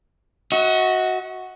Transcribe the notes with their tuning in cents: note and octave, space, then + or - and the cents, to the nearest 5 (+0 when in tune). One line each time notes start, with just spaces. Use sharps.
F#4 +0 D#5 +45